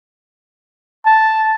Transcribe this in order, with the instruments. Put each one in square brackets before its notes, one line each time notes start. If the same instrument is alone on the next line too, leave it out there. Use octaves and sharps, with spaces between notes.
[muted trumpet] A5